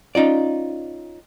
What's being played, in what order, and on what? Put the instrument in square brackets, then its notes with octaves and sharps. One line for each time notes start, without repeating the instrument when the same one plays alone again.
[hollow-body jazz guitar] C#4 D#4 F4 D5